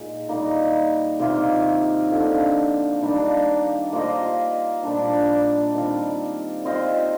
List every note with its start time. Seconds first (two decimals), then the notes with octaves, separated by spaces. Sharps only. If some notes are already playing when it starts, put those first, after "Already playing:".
Already playing: A#2 G#3 D#4
0.29 G3 A#3 D#4
1.19 C3 D#3 A#3 F4
2.10 D3 F3 A#3 D#4
3.02 D#3 G3 A#3 D4
3.93 A#3 F4 C5 D#5
4.83 A#2 G3 D4
5.74 D#3 G3 C4 F4
6.65 C4 F4 C5 D#5